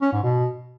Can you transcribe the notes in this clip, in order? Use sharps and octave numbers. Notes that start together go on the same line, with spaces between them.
C#4
G#2
B2